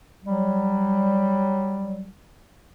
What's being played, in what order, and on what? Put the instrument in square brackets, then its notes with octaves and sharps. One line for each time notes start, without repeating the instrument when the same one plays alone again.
[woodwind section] F#3 G3